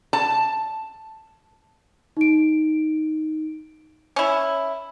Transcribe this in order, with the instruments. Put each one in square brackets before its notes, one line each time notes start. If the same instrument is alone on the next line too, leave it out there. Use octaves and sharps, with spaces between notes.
[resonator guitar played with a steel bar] A5
[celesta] D#4 D7
[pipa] C#4 E4